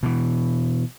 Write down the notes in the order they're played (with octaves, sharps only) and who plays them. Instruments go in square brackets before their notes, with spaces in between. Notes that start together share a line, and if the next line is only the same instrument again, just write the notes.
[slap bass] B2 E3